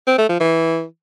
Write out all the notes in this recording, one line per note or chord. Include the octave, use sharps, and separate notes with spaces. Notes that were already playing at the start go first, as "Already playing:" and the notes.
C4
A3
F3
E3